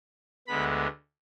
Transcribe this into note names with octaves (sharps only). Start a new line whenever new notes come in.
D2 D3 G#3 B3 B5